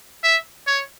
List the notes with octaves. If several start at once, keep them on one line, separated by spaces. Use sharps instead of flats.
E5
C#5